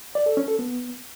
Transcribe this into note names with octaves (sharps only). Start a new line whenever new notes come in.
D5
A4
C#4
A4
B3